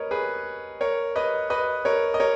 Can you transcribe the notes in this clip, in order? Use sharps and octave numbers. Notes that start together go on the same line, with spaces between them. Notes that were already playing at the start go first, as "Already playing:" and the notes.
Already playing: A#4 B4 C#5 D#5
G#4 B4
A#4 C#5
B4 D#5
B4 D#5
A#4 C#5
D#5
A#4 C#5